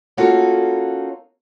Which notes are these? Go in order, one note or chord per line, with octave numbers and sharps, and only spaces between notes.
A#3 C#4 D#4 F4 F#4 A4